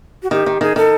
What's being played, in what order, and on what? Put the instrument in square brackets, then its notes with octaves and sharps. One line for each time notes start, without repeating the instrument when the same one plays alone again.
[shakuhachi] F#4
[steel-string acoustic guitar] D#3 [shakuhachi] G4
[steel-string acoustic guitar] D#3
[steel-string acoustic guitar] D#3 [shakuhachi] G#4
[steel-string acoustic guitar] D#3 [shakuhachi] A4